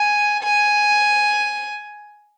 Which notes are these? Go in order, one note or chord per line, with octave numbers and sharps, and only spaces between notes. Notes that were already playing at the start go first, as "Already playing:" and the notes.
Already playing: G#5
G#5